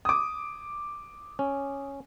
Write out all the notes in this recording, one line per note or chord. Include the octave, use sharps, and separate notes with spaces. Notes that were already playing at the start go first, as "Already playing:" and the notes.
D6 D#6
C#4